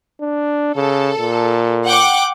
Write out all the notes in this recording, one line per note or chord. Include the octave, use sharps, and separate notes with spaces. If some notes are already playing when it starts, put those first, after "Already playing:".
D4
C#3 A4
A#2
F#5 G5 D6